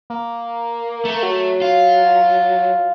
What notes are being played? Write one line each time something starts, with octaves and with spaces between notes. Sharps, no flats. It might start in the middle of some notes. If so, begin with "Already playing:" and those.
A#3
A3
F#3
F4